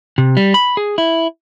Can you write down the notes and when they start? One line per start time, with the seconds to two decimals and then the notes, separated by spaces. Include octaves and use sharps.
0.18 C3
0.37 G3
0.54 B5
0.77 G#4
0.98 E4